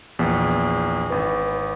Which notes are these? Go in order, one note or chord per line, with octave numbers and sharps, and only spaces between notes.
A#1 E2
G#1 B4